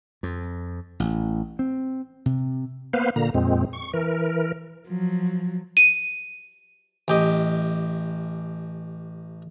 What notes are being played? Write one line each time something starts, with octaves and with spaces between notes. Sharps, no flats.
F2
A1
C4
C3
A#3 B3 B4 C5 F5
A#2 D3 A#3 A#5
F2 A#2 G#3 C4
C#6
E3 A#4
F3 F#3
D#7
A1 G4 D#5